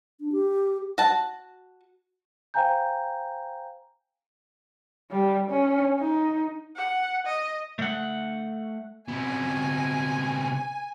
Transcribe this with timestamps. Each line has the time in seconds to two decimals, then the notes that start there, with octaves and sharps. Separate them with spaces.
0.20 D4
0.32 G4
0.98 F#4 A5
2.54 C5 F5 G5 G#5 A#5 G6
5.11 G3
5.50 C#4
6.00 D#4
6.77 F#5
7.26 D#5
7.79 A3 F#5
9.09 C3 B3 G#5